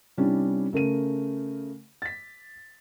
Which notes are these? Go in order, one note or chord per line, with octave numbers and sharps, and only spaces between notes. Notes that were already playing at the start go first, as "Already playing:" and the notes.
C3 G3 C#4 D4 E4
C#3 A3 A#4 D#7
A6 B6